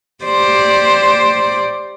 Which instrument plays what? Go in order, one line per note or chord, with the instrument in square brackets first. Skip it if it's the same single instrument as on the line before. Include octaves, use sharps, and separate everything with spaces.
[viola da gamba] G4 C5 D5